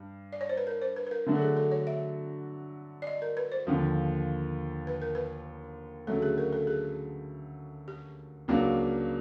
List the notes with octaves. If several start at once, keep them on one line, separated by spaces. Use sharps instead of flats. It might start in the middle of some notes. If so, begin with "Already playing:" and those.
Already playing: G2
D5
C#5
C5
B4
A#4
C5
B4
B4
A#4
D3 F#3 A3 D4 F#4
A4
G#4
A4
C#5
E5
D5
D#5
A#4
B4
C5
D#2 D3 F3
B4
A#4
B4
D2 C#3 F#3 A3 A4
G#4
A#4
A4
G#4
G4
C#2 C#3 F#3 A#3 D4